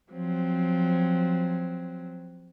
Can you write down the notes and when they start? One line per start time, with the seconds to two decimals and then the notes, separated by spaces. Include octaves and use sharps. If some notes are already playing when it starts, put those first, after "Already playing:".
0.11 F3 F#3 C4